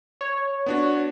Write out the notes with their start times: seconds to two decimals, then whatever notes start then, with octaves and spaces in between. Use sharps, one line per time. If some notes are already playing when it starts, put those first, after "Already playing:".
0.21 C#5
0.66 B3 D4 F#4